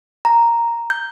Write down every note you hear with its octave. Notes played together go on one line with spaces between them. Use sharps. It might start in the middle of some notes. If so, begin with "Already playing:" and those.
A#5
G6